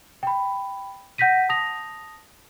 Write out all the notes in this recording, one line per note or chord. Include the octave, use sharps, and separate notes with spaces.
G5 B5
F#5 G6 A#6 B6 D#7
A5 D#6 A#6 F7